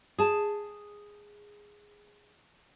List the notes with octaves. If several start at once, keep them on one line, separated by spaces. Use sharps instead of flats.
G#4 A5